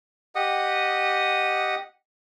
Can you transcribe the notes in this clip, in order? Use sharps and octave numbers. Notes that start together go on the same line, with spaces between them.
G4 D#5 F#5 D#6